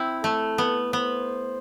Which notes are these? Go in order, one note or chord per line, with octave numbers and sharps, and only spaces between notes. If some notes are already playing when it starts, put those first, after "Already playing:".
Already playing: C4 E4
A3 A4
B3
B3 C5